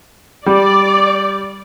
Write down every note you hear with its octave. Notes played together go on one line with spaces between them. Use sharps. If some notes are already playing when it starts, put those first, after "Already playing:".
G3 D5